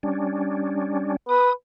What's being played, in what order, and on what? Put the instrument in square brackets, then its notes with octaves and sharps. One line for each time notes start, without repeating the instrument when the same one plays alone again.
[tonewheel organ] G3 C#4 D4
[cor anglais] B4 [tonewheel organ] D#6